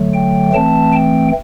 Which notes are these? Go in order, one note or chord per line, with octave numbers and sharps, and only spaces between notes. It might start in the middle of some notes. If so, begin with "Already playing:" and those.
Already playing: D3 F#3 A3
G5
E3 A3 C4 A5
G5